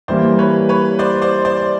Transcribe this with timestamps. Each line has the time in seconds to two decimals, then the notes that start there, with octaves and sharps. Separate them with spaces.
0.08 E3 G3 A#3 C5 D5
0.39 B4 C#5
0.69 B4 C#5
0.99 C5 D5
1.21 C5 D5
1.45 C5 D5